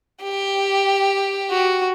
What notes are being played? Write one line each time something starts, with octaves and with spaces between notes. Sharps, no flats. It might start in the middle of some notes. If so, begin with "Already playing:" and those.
G4
F#4